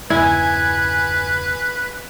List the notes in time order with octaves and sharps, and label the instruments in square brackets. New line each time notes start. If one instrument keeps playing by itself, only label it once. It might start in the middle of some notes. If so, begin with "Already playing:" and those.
[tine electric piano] E2 G2 C#3 [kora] E4 [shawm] B4 [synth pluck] G#5 G#6